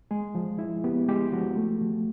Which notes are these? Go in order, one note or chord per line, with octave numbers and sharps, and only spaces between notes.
G#3 G#4
F3
E4
B3 G4
G#3 G4
F3 F#4
A3
F3